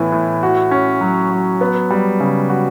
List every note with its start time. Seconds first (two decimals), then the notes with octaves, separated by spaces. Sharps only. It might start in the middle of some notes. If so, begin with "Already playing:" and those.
Already playing: A2 E3 B3
0.12 A2
0.43 F#4
0.71 C#4
1.01 F#3
1.31 F#3
1.61 B3
1.90 G3
2.20 C#3
2.50 F#4